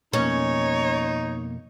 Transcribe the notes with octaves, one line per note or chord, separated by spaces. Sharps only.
F2 B2 A#3 C#4 D#4 C#5